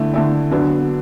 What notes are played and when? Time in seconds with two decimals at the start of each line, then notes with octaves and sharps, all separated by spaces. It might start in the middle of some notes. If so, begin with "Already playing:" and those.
Already playing: D3 A3 E4
0.14 D3 A3 E4
0.51 D3 F#3 B3 D4